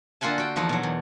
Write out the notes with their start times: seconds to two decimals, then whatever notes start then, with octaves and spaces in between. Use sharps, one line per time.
0.21 D3 A#3 F4 F#5 G#5 A5
0.38 F#4 G5
0.56 E2 F3 D#4 F#5
0.69 B2 F#3
0.83 E2